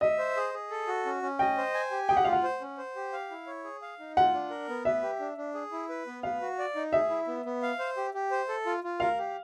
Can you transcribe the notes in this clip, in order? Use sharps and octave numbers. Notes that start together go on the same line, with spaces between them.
D#5 E5
C5
G#4
G#4
A4
F#4
C#4
C#4
D#5 G5
C5
G#5
G4
G#4 G5
F#5
F4 F5
F#5
C5
C#4
C5
G4
F5
E4
C#5
G#4
F5
D#4
F4 F#5
D4
A#4
B3
B4 E5
G4
D4
D4
G#4
E4
B4
B3
B4 F5
F#4
D5
D#4
G#4 E5
E4
B3
B3
F5
C5
G4
G4
C5
A4
F4
F4
A#4 F5
G4